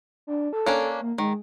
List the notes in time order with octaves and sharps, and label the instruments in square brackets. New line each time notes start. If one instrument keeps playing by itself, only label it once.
[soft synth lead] D4
A4
[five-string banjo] A#3 C#4 D4
[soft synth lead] A#3
[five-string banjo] D#3 [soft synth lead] G#3